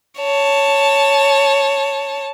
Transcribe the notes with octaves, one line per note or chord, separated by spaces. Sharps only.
C#5 A5